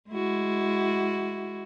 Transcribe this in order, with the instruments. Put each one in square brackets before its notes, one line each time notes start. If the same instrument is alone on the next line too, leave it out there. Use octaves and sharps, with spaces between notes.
[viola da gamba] G#3 E4 F#4